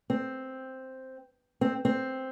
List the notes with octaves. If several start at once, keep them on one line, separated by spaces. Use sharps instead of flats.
C4
C4
C4